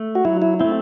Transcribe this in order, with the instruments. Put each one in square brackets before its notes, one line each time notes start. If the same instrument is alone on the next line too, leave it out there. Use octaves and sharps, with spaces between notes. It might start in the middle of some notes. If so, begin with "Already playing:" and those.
Already playing: [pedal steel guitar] A3
[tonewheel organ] F#4
[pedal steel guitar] F#3 [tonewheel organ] E4
[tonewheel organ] E4
[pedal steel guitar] A3 C4 [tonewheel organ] E4